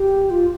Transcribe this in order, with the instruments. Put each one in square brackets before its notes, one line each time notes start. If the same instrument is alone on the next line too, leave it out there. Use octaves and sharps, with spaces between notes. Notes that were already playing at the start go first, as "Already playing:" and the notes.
Already playing: [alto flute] G4
F4